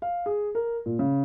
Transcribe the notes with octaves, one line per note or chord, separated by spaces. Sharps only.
F5
G#4
A#4
A#2
C#3